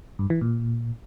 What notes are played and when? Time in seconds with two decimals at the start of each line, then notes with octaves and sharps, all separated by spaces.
0.19 G2
0.30 E3
0.41 A#2